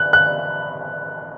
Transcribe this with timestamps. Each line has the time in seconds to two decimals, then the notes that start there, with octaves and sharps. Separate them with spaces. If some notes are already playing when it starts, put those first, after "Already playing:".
Already playing: F#6
0.13 F#6